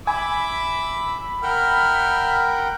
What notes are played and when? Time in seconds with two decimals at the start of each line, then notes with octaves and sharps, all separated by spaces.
0.07 E5 G#5 B5 D6 E6
1.43 A#4 E5 F#5 G5 F6